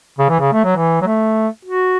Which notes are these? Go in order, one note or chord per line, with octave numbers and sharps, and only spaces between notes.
C#3
E3
C#3
A3
F#3
E3
F#3
A3
F#4